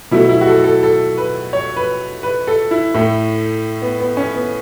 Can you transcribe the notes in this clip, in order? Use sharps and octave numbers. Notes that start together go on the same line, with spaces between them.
B2 F#3 A3 E4
E4
F#4
A4
A4
A4
B4
C#5
B4
B4
A4
E4
A2 A3
B3
B3
C#4
B3